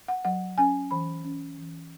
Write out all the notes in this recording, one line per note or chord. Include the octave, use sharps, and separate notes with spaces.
F#5
F#3 F#5
C#4 G#5
E3 B5
C#4
E3